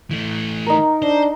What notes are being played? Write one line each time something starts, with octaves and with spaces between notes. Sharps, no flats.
E3 A3
D#4 A#4
D4 C5